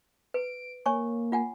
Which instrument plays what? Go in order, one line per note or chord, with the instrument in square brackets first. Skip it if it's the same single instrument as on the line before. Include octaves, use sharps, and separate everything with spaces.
[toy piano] B4 [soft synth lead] D7
[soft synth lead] A#3 [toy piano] C#5 G#5 C#6
[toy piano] F4 F#5 G#5